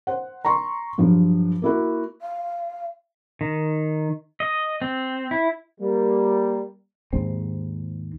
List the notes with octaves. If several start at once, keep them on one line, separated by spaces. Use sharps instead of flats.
C5 F#5
A#5 C6 C#6
G2 F3 F#3
A#3 E4 F#4
F5
D#3
D#5
C4
E4
G3 A#3
D#2 G#2 C4